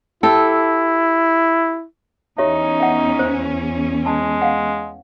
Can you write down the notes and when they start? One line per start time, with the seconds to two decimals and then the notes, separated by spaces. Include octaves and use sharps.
0.23 E4 G4 A4
2.38 E2 C#4 D#4 G4 C#5 E5
2.80 E5 F#5
3.19 C5
4.06 G#3 A5
4.42 F5 F#5